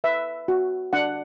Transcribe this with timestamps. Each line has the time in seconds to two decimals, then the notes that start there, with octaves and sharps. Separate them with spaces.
0.04 B4 E5
0.48 F#4
0.93 D4 F#5